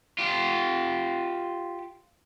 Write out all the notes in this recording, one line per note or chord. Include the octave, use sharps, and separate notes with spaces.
F4 G4